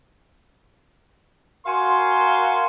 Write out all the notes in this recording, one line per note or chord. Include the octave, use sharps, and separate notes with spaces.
F#4 A#4 F5 G#5 C6